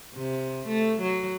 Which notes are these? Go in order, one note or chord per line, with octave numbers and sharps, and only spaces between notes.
C3
A3
F#3